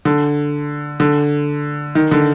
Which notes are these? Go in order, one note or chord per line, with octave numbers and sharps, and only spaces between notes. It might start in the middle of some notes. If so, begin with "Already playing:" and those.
D3
D3
D#3
D3